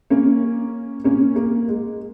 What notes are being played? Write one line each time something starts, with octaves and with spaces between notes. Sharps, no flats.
A#3 C#4
A#3 C#4
A#3
G#3